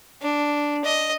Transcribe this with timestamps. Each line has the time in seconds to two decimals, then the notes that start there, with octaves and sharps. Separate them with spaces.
0.22 D4
0.85 D#5